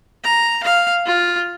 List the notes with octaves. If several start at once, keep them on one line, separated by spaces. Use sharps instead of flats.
A#5
F5
F4